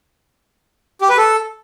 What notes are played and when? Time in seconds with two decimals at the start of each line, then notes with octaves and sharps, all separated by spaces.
1.01 G4
1.09 B4
1.17 A4